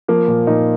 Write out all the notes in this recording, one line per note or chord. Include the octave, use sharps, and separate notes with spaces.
F3 A#3
A#2
A#2 D#4